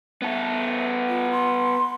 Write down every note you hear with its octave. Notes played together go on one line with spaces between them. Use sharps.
B3 A4 E5
F4
C6